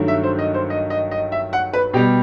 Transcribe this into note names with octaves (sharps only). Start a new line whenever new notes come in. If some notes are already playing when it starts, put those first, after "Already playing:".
Already playing: G2 D#3 F#3 A3
E5
C5
D#5
C5
D#5
D#5
D#5
E5
F#5
B4
B2 G3 G4